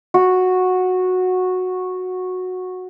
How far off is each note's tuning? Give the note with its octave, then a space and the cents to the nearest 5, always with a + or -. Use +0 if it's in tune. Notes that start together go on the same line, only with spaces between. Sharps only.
F#4 -10